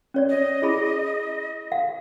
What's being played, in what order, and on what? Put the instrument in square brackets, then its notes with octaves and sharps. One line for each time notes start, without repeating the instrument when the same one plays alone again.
[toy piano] C#4 C#5 D5
[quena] D#5
[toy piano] E4 G#4 B5
F5 F#5